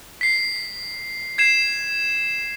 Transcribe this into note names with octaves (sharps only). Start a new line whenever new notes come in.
B6 C7
G#6 C7 E7